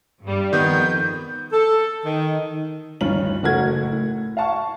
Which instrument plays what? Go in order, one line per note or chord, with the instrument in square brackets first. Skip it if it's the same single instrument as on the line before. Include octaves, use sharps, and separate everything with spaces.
[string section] G2 G3
[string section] F2 [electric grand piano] D#3 B3 [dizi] G6
[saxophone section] A4
D#3
[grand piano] D1 G2 D#3 C#4 F4 F#7
F#1 A3 F#4 A#4 F#5 G#6
A2
F5 F#5 A5 C#6